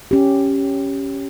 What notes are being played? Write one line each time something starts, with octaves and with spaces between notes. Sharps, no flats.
C#4 G4